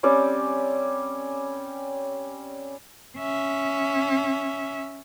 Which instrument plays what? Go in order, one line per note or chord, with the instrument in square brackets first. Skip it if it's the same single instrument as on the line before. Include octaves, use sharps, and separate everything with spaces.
[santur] G3 C4 C#4 D5
[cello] C#4 E5